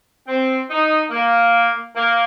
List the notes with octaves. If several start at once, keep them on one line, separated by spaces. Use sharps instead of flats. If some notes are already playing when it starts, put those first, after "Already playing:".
C4
D#4
A#3
A#3